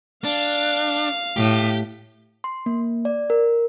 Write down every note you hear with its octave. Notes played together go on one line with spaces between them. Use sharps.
D4 F5
A2 G4
C6
A#3
D5
A#4